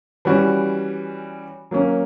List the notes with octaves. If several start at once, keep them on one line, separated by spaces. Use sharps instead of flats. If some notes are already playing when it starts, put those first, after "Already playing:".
E3 G3 C#4 F#4
F#3 A#3 C#4